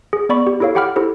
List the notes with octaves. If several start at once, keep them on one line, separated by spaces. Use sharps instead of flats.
G#4
B3 D5 B5 C#6
G4
E4 G4 A4 C#5 F5
G4 F#5 G5 B5 D6 F6
E4 G4 A4 C5